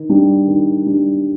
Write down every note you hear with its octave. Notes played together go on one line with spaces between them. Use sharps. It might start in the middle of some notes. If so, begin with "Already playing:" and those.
Already playing: D#3
G3 D4
D#3
G3 D4